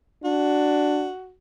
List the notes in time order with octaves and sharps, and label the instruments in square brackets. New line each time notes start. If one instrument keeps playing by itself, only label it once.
[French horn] D4 [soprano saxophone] F#4